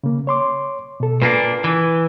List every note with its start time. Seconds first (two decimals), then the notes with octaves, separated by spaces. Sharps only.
0.04 C#3 A#3
0.27 C#5 C6 D6
1.00 B2 A4
1.22 A#2 A#3 D4 B4
1.64 E3